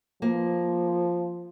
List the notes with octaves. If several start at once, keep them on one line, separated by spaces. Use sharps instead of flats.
F3 A#3